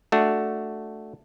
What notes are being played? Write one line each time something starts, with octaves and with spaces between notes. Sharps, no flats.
A3 D4 F#4